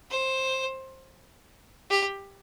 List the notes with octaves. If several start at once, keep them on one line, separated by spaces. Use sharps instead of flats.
C5
G4